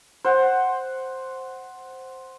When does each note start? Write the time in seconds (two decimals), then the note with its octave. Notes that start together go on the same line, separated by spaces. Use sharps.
0.25 C5 F#5